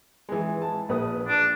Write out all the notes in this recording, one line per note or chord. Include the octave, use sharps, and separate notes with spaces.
E3 G#3
A5
A#1 B4 D#6
D4 D6